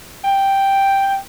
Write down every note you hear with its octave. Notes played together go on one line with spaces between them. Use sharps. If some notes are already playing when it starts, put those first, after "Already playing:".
G5